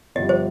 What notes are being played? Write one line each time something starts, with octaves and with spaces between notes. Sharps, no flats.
G1 G2 F3 D#5
C5